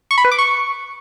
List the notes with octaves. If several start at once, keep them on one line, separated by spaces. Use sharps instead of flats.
C#6
B5
B4
D6
C#6